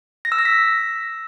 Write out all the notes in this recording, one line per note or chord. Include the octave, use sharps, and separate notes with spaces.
A#6
E6
A#6
B6